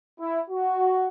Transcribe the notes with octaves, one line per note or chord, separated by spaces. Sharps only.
E4
F#4